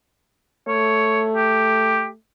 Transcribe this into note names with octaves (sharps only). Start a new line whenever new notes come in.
A3 C#5
G4